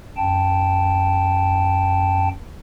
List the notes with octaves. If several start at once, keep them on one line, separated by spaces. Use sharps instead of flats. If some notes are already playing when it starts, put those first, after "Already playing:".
F#2 G5 A5